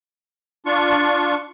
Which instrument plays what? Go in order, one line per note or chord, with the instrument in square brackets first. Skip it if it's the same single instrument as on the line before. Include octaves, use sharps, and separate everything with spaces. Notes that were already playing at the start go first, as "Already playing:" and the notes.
[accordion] D4 F4 C#6